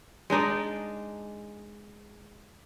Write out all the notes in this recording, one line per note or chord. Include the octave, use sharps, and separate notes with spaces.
G#3 D4 D#4 D5